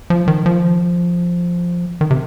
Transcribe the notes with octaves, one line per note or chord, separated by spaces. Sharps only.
F3
D#3
F3
D#3
C3